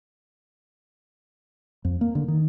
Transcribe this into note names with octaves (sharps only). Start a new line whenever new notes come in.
F2
A#3
D3
D#3